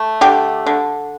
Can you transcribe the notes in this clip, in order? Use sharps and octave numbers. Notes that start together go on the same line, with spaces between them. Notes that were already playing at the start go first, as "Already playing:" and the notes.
Already playing: A3
D3 G4
D3